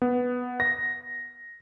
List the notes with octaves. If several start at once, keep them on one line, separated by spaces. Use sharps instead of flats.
B3
A#6